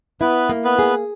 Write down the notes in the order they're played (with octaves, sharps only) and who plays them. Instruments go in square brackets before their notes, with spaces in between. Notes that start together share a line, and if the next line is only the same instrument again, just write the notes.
[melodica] B3 B4 [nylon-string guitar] E4
[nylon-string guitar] A#3
[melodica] B3 B4
[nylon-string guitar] G#4